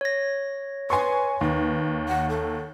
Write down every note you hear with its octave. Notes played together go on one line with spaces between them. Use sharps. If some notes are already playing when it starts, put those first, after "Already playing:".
C#5 A#6
B4 G#5 C6 C#6
D#2 B4
F#5
A4